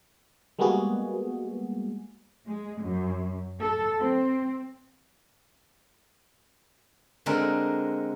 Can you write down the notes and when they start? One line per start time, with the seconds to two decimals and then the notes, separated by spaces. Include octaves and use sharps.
0.59 G3 G#3 A#3 B3 F#4 G#4
2.48 G#3
2.83 F#2
3.58 A4
3.98 C4
7.26 D3 G#3 C4 A#4